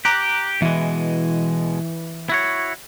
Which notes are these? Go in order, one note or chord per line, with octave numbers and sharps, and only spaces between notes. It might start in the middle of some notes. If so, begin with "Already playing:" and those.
G4 A#5 D6 F#6
B2 E3 G#3
E4 F#4 C#5